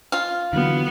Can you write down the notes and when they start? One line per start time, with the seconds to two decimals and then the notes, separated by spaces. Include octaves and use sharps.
0.12 F4 F5
0.53 D3 E3 F#3 B3